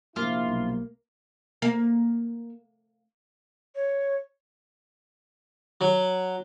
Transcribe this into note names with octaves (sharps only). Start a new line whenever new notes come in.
A#1 C3 A#3 E4 F4
B1
A#3
C#5
F#3